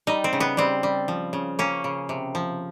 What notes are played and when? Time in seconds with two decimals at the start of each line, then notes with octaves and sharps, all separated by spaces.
0.07 G3 D#4
0.24 C4
0.33 C#3
0.40 B3
0.57 G3 C4
0.83 G3
1.08 F3
1.33 C#3
1.59 A#3 C#4
1.84 C#3
2.09 C3
2.35 F3